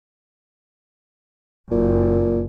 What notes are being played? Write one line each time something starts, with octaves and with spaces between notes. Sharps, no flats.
F#1 A#2